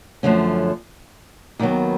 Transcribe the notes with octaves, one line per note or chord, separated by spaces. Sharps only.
F#2 D3 F3 A3 C#4
D#2 D#3 F#3 B3